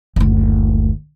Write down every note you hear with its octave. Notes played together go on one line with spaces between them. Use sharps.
F#1 D2